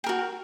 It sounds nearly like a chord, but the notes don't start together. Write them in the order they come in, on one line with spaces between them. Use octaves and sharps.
G5 A#4 F#4